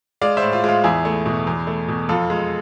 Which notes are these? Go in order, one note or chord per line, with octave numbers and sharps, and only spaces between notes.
G#3 D5 F5
C5 E5
A2
F4
G#3 F4
E2 E4 G#4
A3
B2
E2
A3
B2
F2 F4 A4
G#3